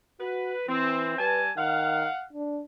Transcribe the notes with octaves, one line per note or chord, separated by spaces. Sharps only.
F#4 B4
E3 C4
G3 B4 G#5 A5
D#3 F5 F#5
D4